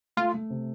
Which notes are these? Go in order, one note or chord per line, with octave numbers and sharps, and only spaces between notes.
A3 F4
A3
C3